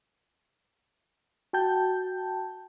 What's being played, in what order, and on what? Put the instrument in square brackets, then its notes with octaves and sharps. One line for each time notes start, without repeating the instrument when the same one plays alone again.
[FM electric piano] F#4 G5 A5 G6